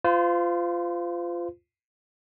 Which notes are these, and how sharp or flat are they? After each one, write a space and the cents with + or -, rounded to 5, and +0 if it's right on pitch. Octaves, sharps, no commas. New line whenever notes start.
F4 -10 C5 -35